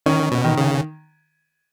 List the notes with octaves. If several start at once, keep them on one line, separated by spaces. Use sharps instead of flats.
D#3 C#4
B2
D#3
C#3